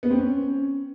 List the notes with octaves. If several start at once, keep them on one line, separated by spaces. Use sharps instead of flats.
B3
C4
C#4